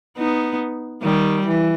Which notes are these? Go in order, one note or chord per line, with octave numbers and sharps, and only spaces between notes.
B3 D#4
D#3 G3
E3